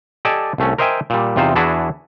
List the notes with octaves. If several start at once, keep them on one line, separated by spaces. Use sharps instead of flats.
G4 A4 D5 D#5 G#5 A5
C2 A3 C#4
A#4 C5 D#5 E5 G5 G#5
A#2 G3
E2 C3 D#4 F4 C5
E2 D4 E4 F#4 G#4 A5